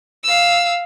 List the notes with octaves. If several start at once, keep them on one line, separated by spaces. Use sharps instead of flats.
F5 E6